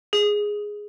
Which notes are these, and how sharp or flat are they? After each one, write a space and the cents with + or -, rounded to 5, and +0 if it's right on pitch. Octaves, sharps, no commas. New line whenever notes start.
G#4 +0